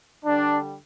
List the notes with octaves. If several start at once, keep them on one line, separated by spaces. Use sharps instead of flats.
D3 G3 D4